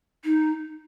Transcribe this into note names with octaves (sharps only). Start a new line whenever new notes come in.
D#4